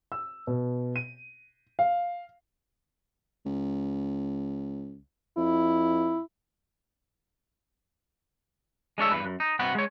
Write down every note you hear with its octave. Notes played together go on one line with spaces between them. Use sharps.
E6
B2
D#7
F5
C#2
F2 E4
G#3 D4 C#5 E5
E2 G2 B4
F#2
D#4
G2 C3 F#4 F#5 B5
G#3 C#5